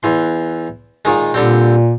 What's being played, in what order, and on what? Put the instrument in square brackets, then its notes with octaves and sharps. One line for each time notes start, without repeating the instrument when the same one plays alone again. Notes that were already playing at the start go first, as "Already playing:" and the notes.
[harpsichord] E2 E3 C6
A#2 D#3 G#3
[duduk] A#2 [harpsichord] D3 G3 C4